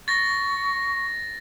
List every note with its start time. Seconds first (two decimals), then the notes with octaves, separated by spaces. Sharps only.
0.08 C#6 A6 A#6